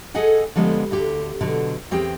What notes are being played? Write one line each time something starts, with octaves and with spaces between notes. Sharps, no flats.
G#4 A4 D#5 F#5 G#5
D3 F3 G3 G#3 B3
D2 D3 G4
B2 D3 F#3
E2 C4 G4 G#4 G5